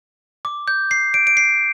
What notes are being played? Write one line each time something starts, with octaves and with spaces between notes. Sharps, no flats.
D6
G6
C7
D7
D7
C7